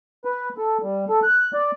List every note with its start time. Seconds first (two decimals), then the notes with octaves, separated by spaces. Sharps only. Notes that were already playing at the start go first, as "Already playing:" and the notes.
0.25 B4
0.58 A4
0.82 G3
1.09 A4
1.23 F#6
1.54 D5